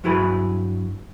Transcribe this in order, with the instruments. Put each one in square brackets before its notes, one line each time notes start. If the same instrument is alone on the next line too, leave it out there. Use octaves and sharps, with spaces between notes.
[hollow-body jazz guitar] G2 F#3 E4 G#4 B4 B5